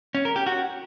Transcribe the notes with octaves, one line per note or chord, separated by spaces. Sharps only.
C#4
A#4
G4
F#4